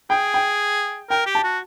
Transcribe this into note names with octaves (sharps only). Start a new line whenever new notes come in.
G#4 G5
G5
A#4 G5
G4
A5
F#4